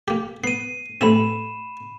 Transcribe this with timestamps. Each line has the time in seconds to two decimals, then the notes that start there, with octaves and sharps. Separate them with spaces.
0.08 A#3 G4
0.44 B3 C7 D#7
1.01 A1 A3 C4 B5 E7